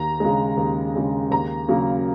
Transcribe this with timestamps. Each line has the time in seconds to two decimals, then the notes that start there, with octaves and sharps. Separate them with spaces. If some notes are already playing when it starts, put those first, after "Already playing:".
Already playing: D#2 A#5
0.20 C#3 G#3
0.57 D#2
0.95 C#3 G#3
1.31 D#2 A#5
1.69 C#3 F#3 A#3